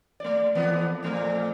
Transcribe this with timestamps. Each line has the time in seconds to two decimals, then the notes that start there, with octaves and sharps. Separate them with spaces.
0.20 A3 D5
0.55 F2 E3 B3
1.03 F2 A#2 A3